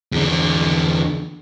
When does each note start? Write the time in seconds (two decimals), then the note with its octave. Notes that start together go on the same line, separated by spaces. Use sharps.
0.12 E2 D3